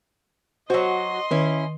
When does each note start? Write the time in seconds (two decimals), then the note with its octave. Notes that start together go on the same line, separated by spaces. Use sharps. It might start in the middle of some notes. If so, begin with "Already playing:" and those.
0.70 F#3 F#4 C5 D#5 C6
1.31 D#3 C#4 E4